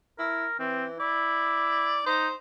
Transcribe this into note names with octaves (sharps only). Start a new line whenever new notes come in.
E4 A#4
E3 C4
E4 D5
D#4 C5